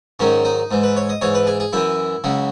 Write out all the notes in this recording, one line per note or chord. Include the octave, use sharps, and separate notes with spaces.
G#2 D#3 F#3 C#4
D#4
G#2 E3
B4
C#5
D#5
G#2 E3 C#5
B4
G#4
G#4
F#2 E3 E4
C#2 C#3 F#3